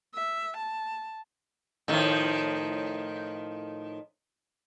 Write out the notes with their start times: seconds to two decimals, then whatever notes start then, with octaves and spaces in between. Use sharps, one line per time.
0.15 E5
0.57 A5
1.88 A2 D#3 F3